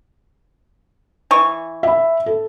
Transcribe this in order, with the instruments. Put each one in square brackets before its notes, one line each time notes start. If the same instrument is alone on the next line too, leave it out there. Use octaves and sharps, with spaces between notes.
[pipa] E3 C#6
[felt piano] E5 B5
A4